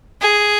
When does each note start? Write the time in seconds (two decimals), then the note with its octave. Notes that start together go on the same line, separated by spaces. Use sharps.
0.22 G#4